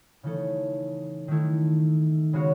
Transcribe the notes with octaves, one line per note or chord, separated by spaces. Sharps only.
C#3 E3 A3 D#4 A4
D#3 A3 E4
C#3 G#3 B3 F#4 C#5